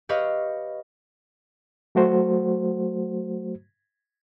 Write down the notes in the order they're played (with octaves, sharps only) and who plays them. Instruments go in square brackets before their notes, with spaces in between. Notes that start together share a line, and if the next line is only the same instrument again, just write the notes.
[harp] G4 B4 C#5 D#5 F5
[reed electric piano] F#3 A3 F#4 C5